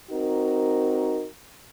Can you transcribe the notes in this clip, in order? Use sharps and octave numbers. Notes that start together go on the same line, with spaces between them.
C4 D#4 F#4 A#4